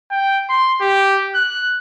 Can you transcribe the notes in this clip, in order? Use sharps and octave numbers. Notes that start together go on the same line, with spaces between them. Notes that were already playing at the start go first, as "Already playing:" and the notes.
G5
C6
G4
F#6